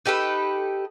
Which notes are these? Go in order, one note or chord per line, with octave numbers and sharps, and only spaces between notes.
D#4 G4 A4 B4